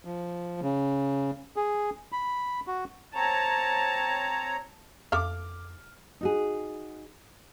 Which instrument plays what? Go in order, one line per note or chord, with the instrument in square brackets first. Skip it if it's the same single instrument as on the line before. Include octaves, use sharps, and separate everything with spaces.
[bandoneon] F3
C#3
G#4
B5
F#4
[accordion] C4 C#5 A#5 [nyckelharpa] A5
[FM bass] F2 [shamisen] A4 E5 F5 [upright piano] D6 F6
[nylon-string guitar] D#4 F#4 G#4